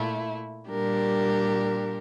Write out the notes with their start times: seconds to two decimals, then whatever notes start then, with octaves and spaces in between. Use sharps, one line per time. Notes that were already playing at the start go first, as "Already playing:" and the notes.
Already playing: A#2 A3 E4
0.70 A#2 G3 D4 G4 A#4